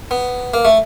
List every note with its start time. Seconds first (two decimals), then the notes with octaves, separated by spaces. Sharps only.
0.11 B3
0.54 A#3
0.65 A3